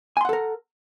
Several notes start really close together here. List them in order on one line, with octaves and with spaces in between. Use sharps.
G#5 C6 F#5 A4 A#4